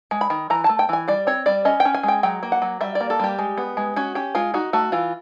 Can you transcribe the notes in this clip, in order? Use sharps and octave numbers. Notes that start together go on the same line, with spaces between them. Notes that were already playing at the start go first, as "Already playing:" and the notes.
G#3
B5
D#3
E3 A#5
A3 A5
G5
E3 G#5
G3 D5
C4 C#5
G3 D5
C#4 D#5
G5
C#4
G#5
G#3 G5
F#3 G5
A#3
F#5
F#3
G3 E5
D5
A#3
A4
G3 G4
G#3
B3
G#3
C#4 F#4
C#4 G4
G#3 F4
D#4 F#4
A3 F#4
E3 F4